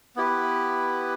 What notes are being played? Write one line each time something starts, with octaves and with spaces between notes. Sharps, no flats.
B3 E4 G4 B4